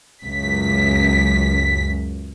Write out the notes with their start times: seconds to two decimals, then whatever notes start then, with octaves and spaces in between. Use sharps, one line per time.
0.24 C#2 F#2 B6